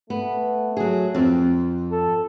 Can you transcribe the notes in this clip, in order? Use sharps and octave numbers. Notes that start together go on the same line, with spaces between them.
A3 B3
F#3 G#4
F2 C4
A4